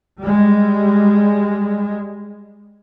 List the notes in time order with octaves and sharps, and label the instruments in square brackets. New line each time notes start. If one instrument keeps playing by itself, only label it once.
[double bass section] G3 G#3